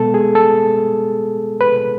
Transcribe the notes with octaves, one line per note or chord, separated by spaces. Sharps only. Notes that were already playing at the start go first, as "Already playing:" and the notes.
Already playing: B2 G#3 B3 A4
G#4
A4
B4